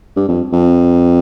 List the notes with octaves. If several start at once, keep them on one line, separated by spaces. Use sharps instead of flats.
G2
F2
F2